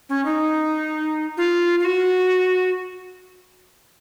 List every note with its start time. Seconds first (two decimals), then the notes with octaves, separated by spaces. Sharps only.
0.09 C#4
0.25 D#4
1.37 F4
1.80 F4
1.85 F#4